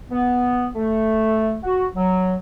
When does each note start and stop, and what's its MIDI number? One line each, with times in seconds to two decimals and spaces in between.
0.11 0.68 59
0.76 1.57 57
1.63 1.86 66
1.95 2.34 54